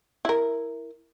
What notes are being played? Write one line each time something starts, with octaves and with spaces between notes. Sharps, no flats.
E4 A#4